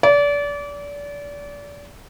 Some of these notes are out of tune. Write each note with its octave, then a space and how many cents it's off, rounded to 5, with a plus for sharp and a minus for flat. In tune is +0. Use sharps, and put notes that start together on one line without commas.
D5 -30